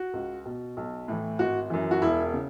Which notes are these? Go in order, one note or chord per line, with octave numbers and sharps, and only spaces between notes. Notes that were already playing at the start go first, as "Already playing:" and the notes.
Already playing: F#4
C#2
B2
B1
A2 E3
G#1 F#4
F#2 E3
F#4
E1 E4
C#3